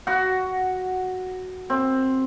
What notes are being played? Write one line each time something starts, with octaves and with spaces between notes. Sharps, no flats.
F#4 F#5
C4